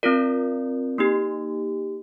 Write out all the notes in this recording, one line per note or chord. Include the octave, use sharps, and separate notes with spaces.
C4 F4 A#4 D5
A#3 D#4 G4